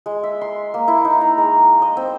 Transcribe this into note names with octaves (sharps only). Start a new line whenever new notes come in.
G#3
E5
C6
A#3
E4
D#4
A#5
G#3
D#5
C4